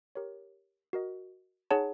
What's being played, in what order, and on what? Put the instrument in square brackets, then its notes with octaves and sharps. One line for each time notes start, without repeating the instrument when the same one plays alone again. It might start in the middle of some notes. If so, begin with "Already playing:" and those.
[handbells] G4 A#4 C#5
F#4 A#4 D#5
D#4 G#4 C#5 F#5 A5